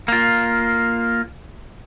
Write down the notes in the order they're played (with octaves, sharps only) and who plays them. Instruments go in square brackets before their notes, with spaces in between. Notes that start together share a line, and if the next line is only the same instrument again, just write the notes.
[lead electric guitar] A#3 F4